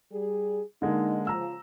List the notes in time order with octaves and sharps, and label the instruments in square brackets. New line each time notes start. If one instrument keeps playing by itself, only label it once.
[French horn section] G3 G#4
[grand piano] D3 G#3 A#3 [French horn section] D#4
[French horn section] C#3 F3 [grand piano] A#5 E6